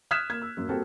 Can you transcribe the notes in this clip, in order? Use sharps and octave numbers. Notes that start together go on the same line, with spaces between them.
D#6 F6 F#6 G#6 B6 E7
A#3 G#6
E6
F#2 A#3
G3 A#3 C4 F#4 A4